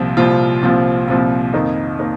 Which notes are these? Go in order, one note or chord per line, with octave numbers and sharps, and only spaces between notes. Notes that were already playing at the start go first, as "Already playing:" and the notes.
Already playing: C2 A#2 F3 C4 F4
C2 A#2 F3 C4 F4
C2 A#2 F3 C4 F4
C2 A#2 F3 C4 F4
F2 D#3 A#3 D#4
A#3 D#4